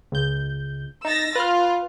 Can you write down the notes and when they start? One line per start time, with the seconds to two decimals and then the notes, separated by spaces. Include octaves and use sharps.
0.12 C#2 G6
1.05 D#4 E6 A6 A#6
1.35 F4 B4 F6